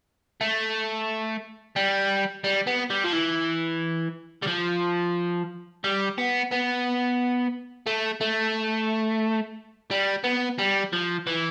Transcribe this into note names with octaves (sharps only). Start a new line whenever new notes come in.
A3
G3
G3
B3
G3
F3
E3
G3
F3
G3
B3
B3
A3
A3
G3
B3
G3
F3
E3